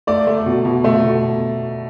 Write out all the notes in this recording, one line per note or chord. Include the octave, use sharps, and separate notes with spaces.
A3 D5
A3
B2
B2
A3
B2